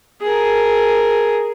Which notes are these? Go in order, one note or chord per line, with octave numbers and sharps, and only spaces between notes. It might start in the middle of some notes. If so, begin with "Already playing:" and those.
G#4 A#4